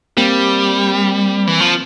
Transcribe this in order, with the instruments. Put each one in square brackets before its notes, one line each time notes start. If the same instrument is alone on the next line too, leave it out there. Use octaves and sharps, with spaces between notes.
[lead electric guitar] G3 [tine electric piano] A#3 C4
[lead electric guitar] E3
F3